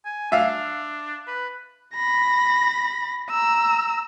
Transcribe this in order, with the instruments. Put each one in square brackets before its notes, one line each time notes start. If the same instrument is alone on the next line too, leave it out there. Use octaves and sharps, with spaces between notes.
[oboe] G#5
[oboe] D4 [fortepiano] E5 F5
[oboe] B4
[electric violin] B5 A#6
A#5 E6